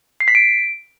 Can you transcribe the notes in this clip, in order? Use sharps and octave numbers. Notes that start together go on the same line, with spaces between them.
C7
B6
D7